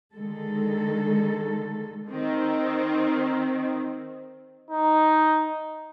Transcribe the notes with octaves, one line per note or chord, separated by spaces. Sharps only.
D3 D#3 G#3 A4
D#3 C4
D#4